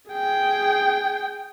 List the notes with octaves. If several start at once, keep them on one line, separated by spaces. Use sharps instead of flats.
G#4 G5